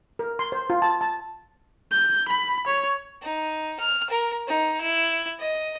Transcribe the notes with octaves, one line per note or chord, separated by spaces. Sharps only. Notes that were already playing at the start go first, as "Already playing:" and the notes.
A#4
C6
C5
F4
A5
A5
G6
B5
C#5
D#4
F6
A#4
D#4
E4
D#5